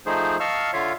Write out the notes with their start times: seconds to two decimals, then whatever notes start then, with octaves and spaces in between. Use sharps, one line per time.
0.06 F3 A3 D#4 G#4 C5
0.40 D#5 F5 A5 C#6 E6 F6
0.73 D3 F4 C#5 E5 F5